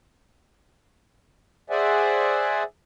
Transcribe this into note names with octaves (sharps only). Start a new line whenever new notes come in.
G#4 C5 D5 E5 F#5 G#5